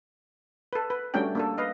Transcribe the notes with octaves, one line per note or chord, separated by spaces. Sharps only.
A4 B4
B4
G3 A3 C#4 D4 F#4 G5
A#3 D4 A4
B4 D#5 F5